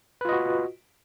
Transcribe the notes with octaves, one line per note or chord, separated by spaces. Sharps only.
F4 F#4 B4 D#5